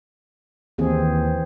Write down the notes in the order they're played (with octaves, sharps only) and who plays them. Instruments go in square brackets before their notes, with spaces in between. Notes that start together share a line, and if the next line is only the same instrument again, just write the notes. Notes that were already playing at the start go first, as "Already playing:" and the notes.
[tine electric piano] D#2 [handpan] E3 C4 G#4